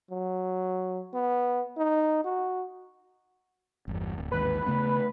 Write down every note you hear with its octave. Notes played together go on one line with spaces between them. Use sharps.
F#3
B3
D#4
F#4
G1 E2
D1
A1 D#2 G#2 B4
C#3 A3 B3